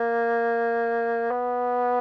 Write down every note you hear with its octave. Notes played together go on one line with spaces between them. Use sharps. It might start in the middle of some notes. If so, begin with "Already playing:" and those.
Already playing: A#3
B3